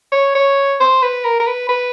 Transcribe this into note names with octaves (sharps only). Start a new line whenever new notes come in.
C#5
C#5
C5
B4
A#4
A#4
B4
B4